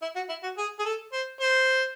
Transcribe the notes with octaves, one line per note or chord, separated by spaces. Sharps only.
E4
F#4
E4
F#4
G#4
G#4
A4
C5
C5